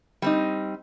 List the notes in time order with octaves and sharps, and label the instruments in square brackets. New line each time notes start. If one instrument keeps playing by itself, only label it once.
[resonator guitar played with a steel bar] G3 C4 D#4